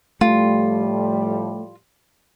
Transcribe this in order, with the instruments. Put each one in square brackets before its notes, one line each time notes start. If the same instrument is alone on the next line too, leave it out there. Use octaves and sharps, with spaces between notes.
[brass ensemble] A2 F3 G3 [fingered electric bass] A3 [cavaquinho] F4